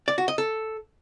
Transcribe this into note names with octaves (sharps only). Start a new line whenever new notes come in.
D5
F#4
D#5
A4